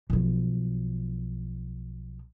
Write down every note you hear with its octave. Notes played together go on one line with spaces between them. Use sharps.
B1 F3